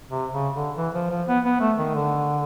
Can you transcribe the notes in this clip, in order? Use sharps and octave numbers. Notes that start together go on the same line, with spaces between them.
C3
C#3
D3
E3
F3
F3
B3
B3
A3
D#3
D3